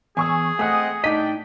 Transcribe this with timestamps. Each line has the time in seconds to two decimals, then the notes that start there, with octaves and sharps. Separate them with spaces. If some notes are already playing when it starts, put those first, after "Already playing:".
0.17 E2 G#4 G#5 C#6 E6
0.59 A3 C4 D#5 F#5 G#5 D#6
1.04 A2 D4 D#4 D5 D#5 G5 B6